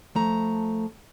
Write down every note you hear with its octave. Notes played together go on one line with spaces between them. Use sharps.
F3 A3 A#5